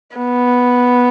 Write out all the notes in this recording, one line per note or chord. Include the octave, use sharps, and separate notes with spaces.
B3